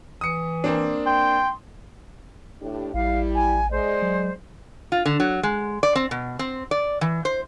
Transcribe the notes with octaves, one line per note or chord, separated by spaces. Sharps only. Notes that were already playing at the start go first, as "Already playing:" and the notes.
E3 D#6 C#7
A#3 C4 D4
G5 C6
A2 D4 G4
A1 G3 E4 F5
G#5
G#3 C5 D5
F#3
F4
D3
F#3
G#3
D5
C4
B2
C4
D5
E3
C5